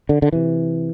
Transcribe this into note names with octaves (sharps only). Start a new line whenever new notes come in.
D3
D3
C3 E3